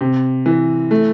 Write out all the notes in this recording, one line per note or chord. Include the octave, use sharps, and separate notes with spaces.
C3
E3
A3